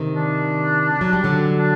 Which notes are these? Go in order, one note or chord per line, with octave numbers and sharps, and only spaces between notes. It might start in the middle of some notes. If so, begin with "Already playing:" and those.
Already playing: C3 D#3
D4
F#3
G3
D3 F#3
D4